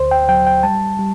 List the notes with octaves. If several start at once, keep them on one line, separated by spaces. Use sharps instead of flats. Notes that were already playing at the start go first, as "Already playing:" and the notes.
Already playing: D2 C5
G5
F#3 G5
G5
G3 A5
G3